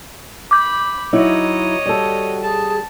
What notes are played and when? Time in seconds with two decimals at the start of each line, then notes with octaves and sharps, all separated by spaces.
0.51 B5 D6 G6
1.13 F#3 D#4 E4 C#5 D#5
1.86 G3 F#4 A4
2.43 G#4 A5